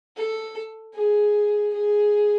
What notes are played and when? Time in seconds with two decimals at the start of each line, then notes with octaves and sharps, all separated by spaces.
0.16 A4
0.94 G#4
1.73 G#4